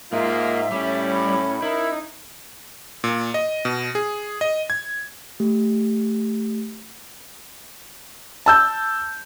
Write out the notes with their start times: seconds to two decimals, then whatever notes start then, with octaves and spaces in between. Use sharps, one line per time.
0.13 G#2 G#3 A#3 F4 E5
0.72 A2 G3 C#4
1.10 B5
1.62 D#4 E4 A#4
3.04 A#2
3.34 D#5
3.65 B2
3.95 G#4
4.41 D#5
4.70 G#6
5.40 A3 G4
8.46 A5 E6 G6